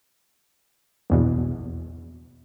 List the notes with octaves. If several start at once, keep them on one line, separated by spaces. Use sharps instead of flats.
A#1 E2 B2